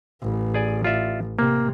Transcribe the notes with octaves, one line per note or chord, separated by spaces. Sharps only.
A1
G#4 D5 G#5
F4 D5 E5
C3 A#3